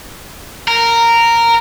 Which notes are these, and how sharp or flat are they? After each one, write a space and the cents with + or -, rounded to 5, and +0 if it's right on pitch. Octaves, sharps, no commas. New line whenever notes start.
A#4 -10